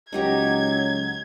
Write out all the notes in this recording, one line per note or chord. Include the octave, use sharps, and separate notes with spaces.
C#2 F#3 D#4 G4 A#5 G#6